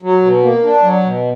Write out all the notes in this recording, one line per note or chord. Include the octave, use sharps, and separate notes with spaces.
F#3
B2
A#3
D4
F#3
B2